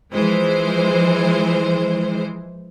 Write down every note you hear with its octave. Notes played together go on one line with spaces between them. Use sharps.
E3 F3 G#3 C5